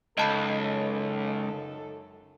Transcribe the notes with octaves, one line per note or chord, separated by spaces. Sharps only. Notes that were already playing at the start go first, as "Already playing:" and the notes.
C#2 F#2 D#4 A4 D#5 A5 B5